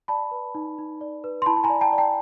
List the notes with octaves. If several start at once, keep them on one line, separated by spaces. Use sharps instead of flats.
D5 A5 B5
B4
D#4
D#4
D5
B4
C6
E4 A5 B5
A5
G#5 A#5
D5
G5 A5
D5
G5 A5